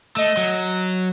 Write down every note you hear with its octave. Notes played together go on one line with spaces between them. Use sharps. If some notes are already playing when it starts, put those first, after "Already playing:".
A3 D#5
F#3